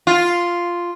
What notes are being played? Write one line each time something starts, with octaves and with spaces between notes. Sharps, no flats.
F4